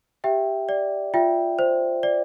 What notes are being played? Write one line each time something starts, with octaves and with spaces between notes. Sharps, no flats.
G4 E5 G5
D5
F4 E5 G5
C5
D5